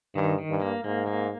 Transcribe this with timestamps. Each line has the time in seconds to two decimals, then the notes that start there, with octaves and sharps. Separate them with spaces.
0.15 G2 D#3
0.38 D#3
0.50 G2
0.61 A#3
0.84 G#2 A#3
1.07 A#3